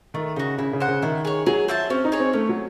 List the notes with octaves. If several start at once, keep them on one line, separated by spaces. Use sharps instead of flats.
D#3 A3
C#3 D#4 F#4
C#3 E4
C#3
C5 F#5
C#3
D#3 E4
G#4 C#5
F#3 G#4
C5 E5 A5
C4 C#4
D#4
G#4 C#5
C4
A3 C#4
F#3